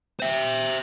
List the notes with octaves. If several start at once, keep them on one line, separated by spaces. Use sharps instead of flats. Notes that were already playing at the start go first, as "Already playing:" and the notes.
C5 E5